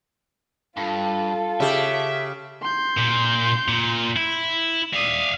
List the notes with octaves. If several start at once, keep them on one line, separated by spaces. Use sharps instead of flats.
G2 F4 A4
C#3 G4 E5
C6 G6
A#2
A#2
E4
D5 E5 F5 D#6